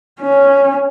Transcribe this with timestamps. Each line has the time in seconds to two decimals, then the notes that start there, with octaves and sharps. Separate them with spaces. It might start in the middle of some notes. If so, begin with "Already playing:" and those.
0.21 C#4